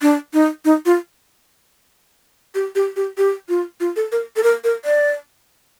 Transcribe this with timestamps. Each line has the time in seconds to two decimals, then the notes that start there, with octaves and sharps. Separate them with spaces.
0.02 D4
0.33 D#4
0.65 D#4
0.86 F4
2.55 G4
2.75 G4
2.96 G4
3.18 G4
3.49 F4
3.80 F4
3.96 A4
4.12 A#4
4.36 A4
4.43 A#4
4.64 A#4
4.85 D5